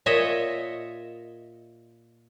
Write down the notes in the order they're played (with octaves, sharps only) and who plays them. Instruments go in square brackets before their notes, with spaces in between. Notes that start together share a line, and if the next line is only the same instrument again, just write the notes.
[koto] A#2 C#5 D#5 E5